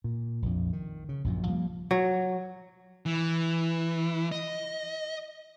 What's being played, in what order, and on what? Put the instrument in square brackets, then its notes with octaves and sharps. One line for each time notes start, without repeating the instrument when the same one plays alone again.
[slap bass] A#2
A#1 F2
D#3
C#3
A#1 F#2 A#2
F3 G3 A#3
[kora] F#3
[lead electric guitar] E3
D#5